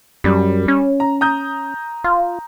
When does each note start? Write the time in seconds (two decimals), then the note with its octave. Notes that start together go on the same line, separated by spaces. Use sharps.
0.24 F#2 G3
0.68 C#4
1.00 A#5
1.21 A#5 D#6 G6
2.04 F4